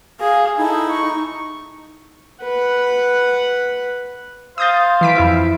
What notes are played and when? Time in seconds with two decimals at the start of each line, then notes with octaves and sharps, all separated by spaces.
0.20 G#4 F5
0.57 D#4 E4 A4
0.89 C#6
2.44 B4 F#5
4.58 C5 F5 D#6 G6 A6
5.01 E3 B6 D7
5.15 F2 E4 E5